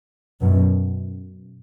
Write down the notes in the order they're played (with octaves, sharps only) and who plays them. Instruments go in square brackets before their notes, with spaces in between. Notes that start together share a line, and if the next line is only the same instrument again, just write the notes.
[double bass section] F#2 B2